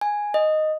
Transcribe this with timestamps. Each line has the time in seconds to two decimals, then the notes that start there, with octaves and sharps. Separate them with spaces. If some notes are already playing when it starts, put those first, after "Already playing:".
0.01 G#5
0.34 D#5